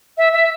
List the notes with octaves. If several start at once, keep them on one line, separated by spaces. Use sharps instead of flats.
E5
E5